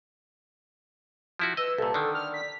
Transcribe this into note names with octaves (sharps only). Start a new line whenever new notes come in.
F3 E4 F#4
B4 D#5 E6
C2 A#2 A4
D3 D#3 D5
F6
B6